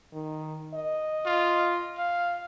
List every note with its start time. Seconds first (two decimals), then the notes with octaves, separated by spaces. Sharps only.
0.13 D#3
0.74 D#5
1.26 F4
1.98 F5